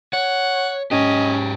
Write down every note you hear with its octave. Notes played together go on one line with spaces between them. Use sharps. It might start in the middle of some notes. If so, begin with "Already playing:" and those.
C#5 F#5
G#2 C#4 G4 D#5